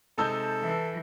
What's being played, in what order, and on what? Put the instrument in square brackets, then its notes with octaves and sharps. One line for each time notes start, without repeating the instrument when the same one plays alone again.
[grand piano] C3 G#3 D#4 [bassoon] A4 [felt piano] A5 E6 G6
[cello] E3